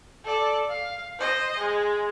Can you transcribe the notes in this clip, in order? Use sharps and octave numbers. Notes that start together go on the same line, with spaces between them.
A4 D5
F5
C5 D#5
G#3